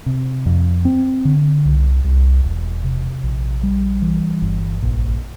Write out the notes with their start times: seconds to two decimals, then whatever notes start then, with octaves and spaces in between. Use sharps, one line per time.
0.06 C3
0.46 F2
0.85 C4
1.25 D3
1.65 C2
2.04 C2
2.44 E1
2.84 C3
3.23 A#1
3.63 G3
4.02 E3
4.42 G1
4.82 A#1